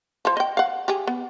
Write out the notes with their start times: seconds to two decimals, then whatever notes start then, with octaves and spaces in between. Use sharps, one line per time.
0.25 F3 C5
0.37 D#5 G5
0.57 F5 F#5
0.88 G4 G#4
1.07 B3